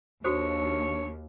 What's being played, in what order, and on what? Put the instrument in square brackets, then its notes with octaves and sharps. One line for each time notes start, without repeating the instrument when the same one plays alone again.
[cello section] D#2 [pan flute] D4 [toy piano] F#4 A4 C5 [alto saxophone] C#5